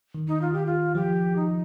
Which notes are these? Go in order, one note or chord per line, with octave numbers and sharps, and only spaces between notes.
D#3
D#4
F4
G4
F4
F3 G4
D#4